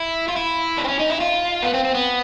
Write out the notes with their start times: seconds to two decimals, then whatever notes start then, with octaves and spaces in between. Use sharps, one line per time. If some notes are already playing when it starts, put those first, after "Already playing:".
Already playing: E4
0.28 F4
0.37 E4
0.78 D4
0.84 C4
0.88 C#4
1.00 D#4
1.10 E4
1.21 F4
1.63 B3
1.74 C4
1.85 C4
1.95 B3